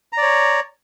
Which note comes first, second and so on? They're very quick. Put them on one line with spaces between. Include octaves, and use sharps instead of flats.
A#5 D5 C#5